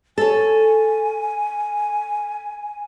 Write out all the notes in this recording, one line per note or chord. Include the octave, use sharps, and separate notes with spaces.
A4 C#5 G#5